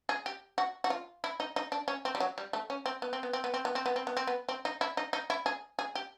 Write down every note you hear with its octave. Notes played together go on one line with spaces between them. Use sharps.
G#4
G4
F#4
F#4
F4
E4
D#4
D#4
D4
C#4
C4
G3
F#3
G3
A3
C#4
C4
B3
C4
B3
C4
B3
C4
B3
C4
B3
C4
B3
C4
B3
C4
D#4
E4
D#4
D#4
E4
G#4
G#4
G4